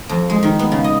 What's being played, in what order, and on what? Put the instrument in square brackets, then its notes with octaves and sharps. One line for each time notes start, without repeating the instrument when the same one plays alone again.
[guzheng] F2
G#3
D#3
B3
C#3
D#5